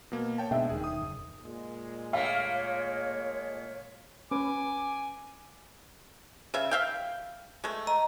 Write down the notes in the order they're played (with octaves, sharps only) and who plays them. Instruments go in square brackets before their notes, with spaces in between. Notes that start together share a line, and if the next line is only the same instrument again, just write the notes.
[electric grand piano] B2 A#3
C#5 G5 A5
[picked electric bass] B2 [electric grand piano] G#3 D4 [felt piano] E5 G5
[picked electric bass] D#1 D#3 [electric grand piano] G#4
[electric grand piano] D#6
[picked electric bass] F#1
[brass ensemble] A#2 G#3
[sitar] A3 A#3 [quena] C#5 [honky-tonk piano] F5
[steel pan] C#4 B4 [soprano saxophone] G#5 [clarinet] D6
[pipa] C#3 E5
E5 F5 G5
G#3 A3
[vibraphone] D#5 A#5